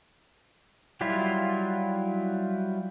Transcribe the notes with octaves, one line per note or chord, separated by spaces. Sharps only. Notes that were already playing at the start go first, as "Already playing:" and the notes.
F#3 G3 E4 F4